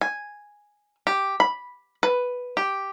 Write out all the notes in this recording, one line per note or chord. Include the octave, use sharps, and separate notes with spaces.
G#5
G4
B5
B4
G4